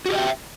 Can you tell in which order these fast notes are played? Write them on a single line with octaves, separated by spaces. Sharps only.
F#4 G4 D#5 G5 E5